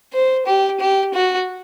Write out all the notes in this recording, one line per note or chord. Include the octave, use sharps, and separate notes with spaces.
C5
G4
G4
F#4